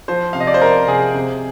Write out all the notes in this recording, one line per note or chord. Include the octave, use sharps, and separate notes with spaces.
F3 C5
C3 F5
D#5
D5
C5
F3 A#4
C3 G#4
C3